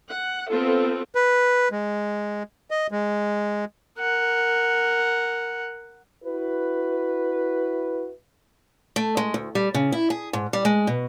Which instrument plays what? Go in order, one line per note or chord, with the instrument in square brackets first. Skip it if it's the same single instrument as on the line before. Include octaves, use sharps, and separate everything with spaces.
[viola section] F#5
B3 C4 F4 A4
[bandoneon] B4
G#3
D#5
G#3
[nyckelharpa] A#4 F#5
[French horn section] E4 F#4 B4
[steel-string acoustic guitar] A3
G#3
D2
G3
C#3
E4
G#4
G#2
G3
G#3
B2